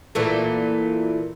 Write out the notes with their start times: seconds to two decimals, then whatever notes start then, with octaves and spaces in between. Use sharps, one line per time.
0.15 A#2 E3 A3